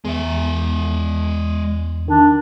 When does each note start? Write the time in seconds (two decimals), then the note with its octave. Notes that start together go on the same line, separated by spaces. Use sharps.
0.05 E2 G#3 E5
2.08 D#3 D4